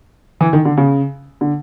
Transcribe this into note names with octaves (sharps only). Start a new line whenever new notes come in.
E3
D#3
D3
C#3
D3